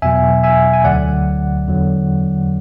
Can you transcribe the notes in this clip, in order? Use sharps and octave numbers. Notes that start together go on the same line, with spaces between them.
E2 B2 F#3 E5 G#5
E5 G#5
G#5
D2 D3 F#3 D5 F#5
E2 D3 F#3